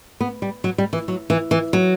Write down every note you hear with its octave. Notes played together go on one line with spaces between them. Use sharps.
B3
G3
F#3
G3
E3
F#3
E3
E3
F#3